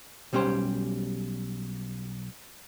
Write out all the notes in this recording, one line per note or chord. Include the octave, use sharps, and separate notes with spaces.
B1 G3 C#4 G4 C5